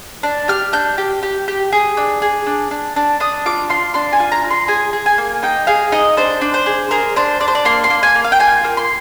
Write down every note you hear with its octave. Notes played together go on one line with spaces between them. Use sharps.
D4
G4 F6
D4 G6
G4
G4
G4
G#4
D4
G#4
D4
D4
D4
D4 D#6
F4 D6
F4 C6
D4 C6
G#5
F4
A#5
F4
C6
G#4 G#5
G#4
G#5
A#3
D#4 G5
G#4 F5
D#4 D#5
D4 C5
D4
C5
G#4
G#4 A#4
D4 C5
D4 D5
C5
D5
A#3 C6
C6
A#3
G#5
A#3
F5
G5
F4 G#5
A#3
C6